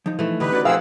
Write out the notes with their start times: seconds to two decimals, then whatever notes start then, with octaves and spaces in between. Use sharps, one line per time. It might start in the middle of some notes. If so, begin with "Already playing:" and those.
0.06 F3 D#4
0.19 E3 A3
0.40 D3 D#4 G4 B4
0.52 C#4 F#4 D5
0.65 F3 C4 G#4 A#4 F5 F#5 E6